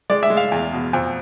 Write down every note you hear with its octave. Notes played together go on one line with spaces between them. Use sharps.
G#3 D5
E5
G#3
F5
E2
B2
F2